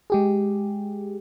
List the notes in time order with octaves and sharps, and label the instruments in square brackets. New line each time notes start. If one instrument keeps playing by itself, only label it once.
[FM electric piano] G#3 G4 G#4